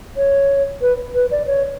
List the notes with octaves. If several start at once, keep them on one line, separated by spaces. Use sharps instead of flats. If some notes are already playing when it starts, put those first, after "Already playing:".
C#5
B4
B4
D5
C#5